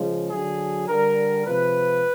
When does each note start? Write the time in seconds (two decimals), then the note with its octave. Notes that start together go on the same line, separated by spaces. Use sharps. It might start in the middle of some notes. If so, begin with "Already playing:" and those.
Already playing: C#3 F3 G#3
0.31 D3 F#3 G#4
0.88 D3 G3 A#4
1.46 C3 F3 G#3 B4